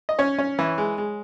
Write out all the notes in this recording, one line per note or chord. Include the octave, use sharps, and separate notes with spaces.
D#5
C#4 C#5
C#4
E3
G#3
G#3